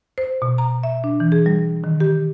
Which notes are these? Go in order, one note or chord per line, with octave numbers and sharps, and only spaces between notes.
C5
B2
A#5
E5
D4
E3
G#4
G3
D#3
G4